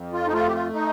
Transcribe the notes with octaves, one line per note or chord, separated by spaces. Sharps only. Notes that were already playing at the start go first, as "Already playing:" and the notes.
Already playing: F2
F4
D#4
A3 F4
G4
F4
D#4